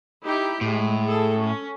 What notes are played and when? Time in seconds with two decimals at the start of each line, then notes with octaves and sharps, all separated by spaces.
0.23 D#4 E4 G4
0.61 A2 G#3
1.07 G#4 A4
1.40 C#4